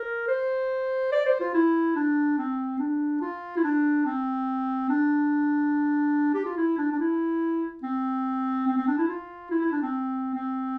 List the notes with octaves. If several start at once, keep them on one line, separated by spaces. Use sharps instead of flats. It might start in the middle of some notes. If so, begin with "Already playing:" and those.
Already playing: A#4
C5
D5
C5
F4
E4
D4
C4
D4
F4
E4
D4
C4
D4
G4
F4
E4
D4
D4
E4
C4
C4
C4
D4
E4
F4
E4
E4
D4
C4
C4